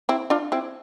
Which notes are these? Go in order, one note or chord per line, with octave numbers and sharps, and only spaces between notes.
C4 E4
D4 F4
C4 E4